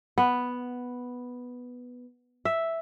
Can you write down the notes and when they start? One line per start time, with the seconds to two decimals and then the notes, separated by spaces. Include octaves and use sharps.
0.18 B3
2.45 E5